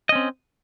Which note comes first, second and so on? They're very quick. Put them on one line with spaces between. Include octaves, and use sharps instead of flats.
D#5 C#4 C4